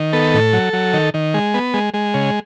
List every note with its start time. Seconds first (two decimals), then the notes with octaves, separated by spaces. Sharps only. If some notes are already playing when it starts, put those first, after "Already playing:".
Already playing: D#3
0.13 B3 A4
0.34 A2
0.53 F#3
0.73 F#3
0.94 D#3
1.14 D#3
1.34 G#3
1.54 B3
1.74 G#3
1.94 G#3
2.14 C#3